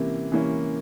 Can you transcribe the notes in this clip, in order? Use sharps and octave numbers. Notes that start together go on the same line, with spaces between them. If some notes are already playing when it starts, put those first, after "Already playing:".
Already playing: C3 E3 A#3 C#4
E3 A#3 C#4